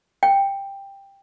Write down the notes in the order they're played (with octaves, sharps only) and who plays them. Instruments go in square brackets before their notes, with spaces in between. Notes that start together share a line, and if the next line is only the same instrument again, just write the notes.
[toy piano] G5